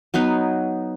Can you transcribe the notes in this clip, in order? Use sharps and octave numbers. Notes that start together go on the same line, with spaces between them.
F#3 B3 D#4 B4